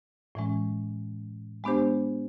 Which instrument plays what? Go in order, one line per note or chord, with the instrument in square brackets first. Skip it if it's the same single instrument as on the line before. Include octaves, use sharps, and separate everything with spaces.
[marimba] A2 E3 G#3 C#4
G#3 B3 D4 G4 C5